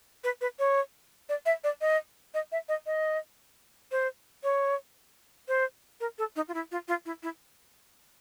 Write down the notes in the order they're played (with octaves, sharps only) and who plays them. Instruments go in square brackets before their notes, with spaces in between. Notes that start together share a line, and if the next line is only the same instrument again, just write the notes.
[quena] B4
B4
C#5
D5
E5
D5
D#5
D#5
E5
D#5
D#5
C5
C#5
C5
A#4
A4
D#4
F4
E4
F4
F4
E4
E4